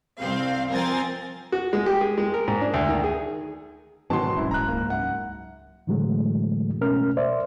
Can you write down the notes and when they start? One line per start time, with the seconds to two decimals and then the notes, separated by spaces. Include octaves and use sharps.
0.19 C2 C4 F5
0.71 F3 C4 A#4 G#5 A6
1.52 F#4
1.73 G#3
1.86 G4
2.01 G#4
2.18 G#3
2.34 A#4
2.48 G#2
2.61 D4
2.74 D2
2.89 D#3
3.04 G#4
4.10 G#2 B2 D#3 E3 F#3 A5 C6
4.36 D1 F#2 E4
4.51 D#1 A#5 F#6
4.68 C#2 A#3
4.90 F#2 F#5
5.87 A2 D3 E3 F#3 G#3 A3
6.81 B2 A3 C#4 A#4 F6
7.17 C5 D5 E5